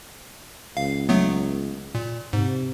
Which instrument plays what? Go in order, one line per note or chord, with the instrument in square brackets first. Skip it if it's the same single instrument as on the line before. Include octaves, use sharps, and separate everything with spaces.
[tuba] C#2 [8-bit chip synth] F5
[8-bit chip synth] F#3 A3 B3
A#2
[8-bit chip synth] G#2 [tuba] C3